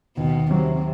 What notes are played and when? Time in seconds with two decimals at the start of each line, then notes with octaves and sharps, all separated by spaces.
0.17 D#2 B2
0.51 C3 F#3